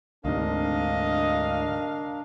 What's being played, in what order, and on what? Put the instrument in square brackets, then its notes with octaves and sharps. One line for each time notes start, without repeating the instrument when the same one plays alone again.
[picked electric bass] D2 G#2 C3 [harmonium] D4 A#4 [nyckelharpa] D#5 [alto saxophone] F5